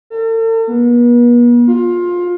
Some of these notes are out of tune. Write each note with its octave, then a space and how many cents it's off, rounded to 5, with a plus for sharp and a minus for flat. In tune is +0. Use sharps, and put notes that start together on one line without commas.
A4 +45
B3 -45
F4 +20